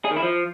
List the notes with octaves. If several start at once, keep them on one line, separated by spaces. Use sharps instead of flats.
G#4
D#3
E4
F3